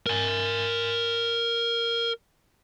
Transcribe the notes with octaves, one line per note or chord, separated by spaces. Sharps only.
A#4 G#5